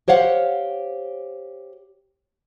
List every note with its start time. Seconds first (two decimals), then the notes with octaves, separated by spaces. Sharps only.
0.08 G4 C5 C#5 F5 F#5